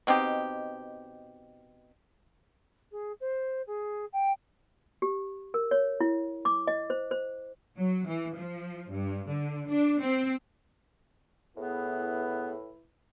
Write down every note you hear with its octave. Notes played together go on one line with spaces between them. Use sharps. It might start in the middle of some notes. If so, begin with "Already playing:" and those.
B2 C4 D#4 G4
G#4
C5
G#4
G5
G4
A#4
C#5
E4
D6
D#5
C5
C5
F#3
E3
F3
G2
D3
D4
C4
A2 B3 E4 G#4 B4